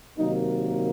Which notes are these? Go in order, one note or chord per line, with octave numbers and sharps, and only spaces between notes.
C3 D#3 F#3 A#3 D#4